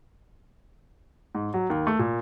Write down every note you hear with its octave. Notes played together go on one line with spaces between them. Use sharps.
G#2
F#3
D#2
A3
A#2